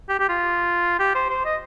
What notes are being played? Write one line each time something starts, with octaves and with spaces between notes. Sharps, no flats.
G4
G4
F4
G4
C5
C5
D#5